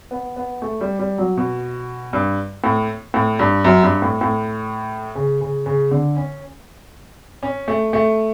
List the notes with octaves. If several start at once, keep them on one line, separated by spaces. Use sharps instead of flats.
B3
B3
A3
G3
G3
F#3
B2
G2
A2
A2
G2
F#2
G2
A2
A2
C#3
C#3
C#3
D3
C#4
C#4
A3
A3